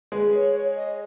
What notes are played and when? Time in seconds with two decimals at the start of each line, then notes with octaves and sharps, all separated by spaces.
0.12 G#3 G#4 B4
0.34 C#5
0.55 C#5
0.71 C#5
0.76 D#5